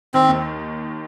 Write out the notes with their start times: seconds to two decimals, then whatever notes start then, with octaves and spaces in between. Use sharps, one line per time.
0.14 D#3 C4
0.28 D#2